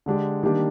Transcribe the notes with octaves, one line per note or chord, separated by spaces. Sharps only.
D3 G#3 D4 G4
D#3 G3 A#3 D4 G4